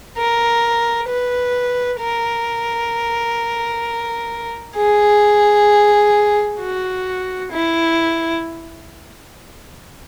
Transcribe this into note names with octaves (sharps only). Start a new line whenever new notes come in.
A#4
B4
A#4
G#4
F#4
E4